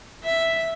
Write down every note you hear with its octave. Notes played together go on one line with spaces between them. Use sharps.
E5